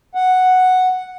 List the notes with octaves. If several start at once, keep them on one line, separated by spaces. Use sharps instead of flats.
F#5